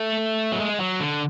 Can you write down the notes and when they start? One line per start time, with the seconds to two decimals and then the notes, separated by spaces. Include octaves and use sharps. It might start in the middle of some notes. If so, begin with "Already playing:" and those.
Already playing: A3
0.52 F#3
0.60 G#3
0.80 F#3
1.00 D3